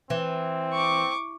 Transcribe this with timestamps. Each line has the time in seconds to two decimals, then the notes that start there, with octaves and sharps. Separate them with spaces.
0.10 E3 C4
0.73 C#6 D6